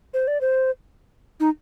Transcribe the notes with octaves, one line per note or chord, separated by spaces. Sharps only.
C5
D5
C5
D#4